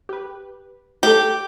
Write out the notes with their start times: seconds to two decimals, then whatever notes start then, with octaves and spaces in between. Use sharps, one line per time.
0.09 G4 B4
1.03 A3 G4 A4